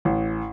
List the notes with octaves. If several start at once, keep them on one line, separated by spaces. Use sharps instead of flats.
A1